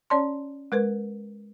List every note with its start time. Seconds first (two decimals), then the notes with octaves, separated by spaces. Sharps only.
0.10 C#4 C#5 D5 A5 C6
0.72 G#3 A#4 B4